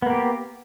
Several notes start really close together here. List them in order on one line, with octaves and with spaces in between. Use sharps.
B3 A#3 G4